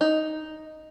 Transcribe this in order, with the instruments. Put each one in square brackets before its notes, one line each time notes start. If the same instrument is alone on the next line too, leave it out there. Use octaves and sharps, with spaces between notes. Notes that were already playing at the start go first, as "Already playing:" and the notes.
[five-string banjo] D#4